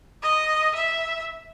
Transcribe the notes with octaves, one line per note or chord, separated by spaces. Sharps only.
D#5
E5